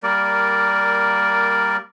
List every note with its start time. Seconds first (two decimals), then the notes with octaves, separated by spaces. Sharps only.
0.03 G3 A#3 A#4 D5